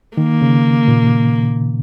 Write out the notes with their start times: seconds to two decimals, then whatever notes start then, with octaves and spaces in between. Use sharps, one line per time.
0.17 D#3 A#3
0.42 C#3
0.88 A#2